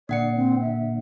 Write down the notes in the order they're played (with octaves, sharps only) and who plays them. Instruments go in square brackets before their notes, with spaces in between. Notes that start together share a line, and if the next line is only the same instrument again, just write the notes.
[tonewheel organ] A#2 D3 [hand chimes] A#3 F#5 C#7 [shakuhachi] D5
[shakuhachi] C4
E5